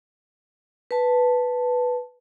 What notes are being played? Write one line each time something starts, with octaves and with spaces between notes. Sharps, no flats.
B4 A5